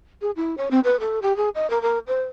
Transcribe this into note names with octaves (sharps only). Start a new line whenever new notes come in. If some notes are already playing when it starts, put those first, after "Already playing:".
G#4
E4
C#5
C4
B4
A4
G4
G#4
D#5
A#4
A#4
C5